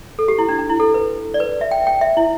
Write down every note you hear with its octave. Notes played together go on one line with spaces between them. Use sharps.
A4
G4
E4
D4
D4
E4
A4
B4
D5
B4
E5
G5
G5
E5
E4